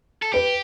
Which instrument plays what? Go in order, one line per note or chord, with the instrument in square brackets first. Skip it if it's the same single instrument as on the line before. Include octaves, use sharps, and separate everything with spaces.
[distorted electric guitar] A4
[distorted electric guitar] G4 [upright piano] B4